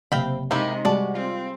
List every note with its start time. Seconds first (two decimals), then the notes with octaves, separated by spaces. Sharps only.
0.12 F#1 C3 C4 F5 G5 B5
0.51 C3 G#3 A#3 D#4 E4 G4 A#5
0.85 C3 G3 G#3 F#4 D5 A5
1.15 C4 F4